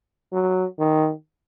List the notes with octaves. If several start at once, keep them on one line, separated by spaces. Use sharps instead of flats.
F#3
D#3